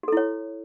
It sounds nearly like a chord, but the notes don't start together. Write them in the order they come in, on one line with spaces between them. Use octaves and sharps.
F#4 A4 E4 C#5